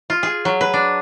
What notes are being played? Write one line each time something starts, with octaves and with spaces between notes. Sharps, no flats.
F4
G#4
F#3
B4
D4